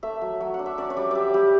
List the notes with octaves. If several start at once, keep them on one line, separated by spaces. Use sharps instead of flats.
A3 E5
F#3
F#3
F#5
D4
E5
C#4 D5
C#5
G3 D5
G3 D5 E5
G3 G4